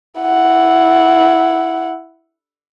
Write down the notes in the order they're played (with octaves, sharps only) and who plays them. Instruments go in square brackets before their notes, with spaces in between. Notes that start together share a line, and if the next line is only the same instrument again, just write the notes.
[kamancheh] E4 F#5